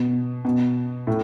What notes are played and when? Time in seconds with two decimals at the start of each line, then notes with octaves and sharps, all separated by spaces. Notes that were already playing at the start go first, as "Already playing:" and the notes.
Already playing: B2
0.45 B2
1.07 A2